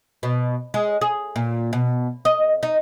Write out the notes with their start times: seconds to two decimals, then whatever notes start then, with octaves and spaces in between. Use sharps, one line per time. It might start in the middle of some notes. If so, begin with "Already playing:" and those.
0.23 B2
0.74 G#3
1.01 G#4
1.36 A#2
1.73 B2
2.25 D#5
2.63 D#4